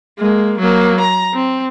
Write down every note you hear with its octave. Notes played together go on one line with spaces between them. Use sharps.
G#3 A#3
F#3 A#3
A#5
C4